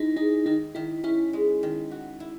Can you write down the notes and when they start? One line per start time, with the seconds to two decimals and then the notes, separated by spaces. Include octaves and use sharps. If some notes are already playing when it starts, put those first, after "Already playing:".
Already playing: G#3 D#4 E4
0.16 D#4 G#4
0.46 D#3 D#4
0.75 D#3 E4
1.04 C#4 E4
1.33 G#3
1.63 D#3
1.91 F#4
2.20 E4